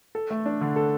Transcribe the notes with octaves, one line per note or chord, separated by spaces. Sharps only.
A4
A3
D4
D3
A4